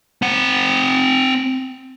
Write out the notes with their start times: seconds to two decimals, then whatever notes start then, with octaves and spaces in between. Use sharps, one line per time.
0.22 C4 F#5